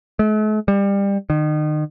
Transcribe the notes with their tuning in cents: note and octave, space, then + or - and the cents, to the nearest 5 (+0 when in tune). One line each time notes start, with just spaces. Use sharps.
A3 -45
G3 +25
D#3 -35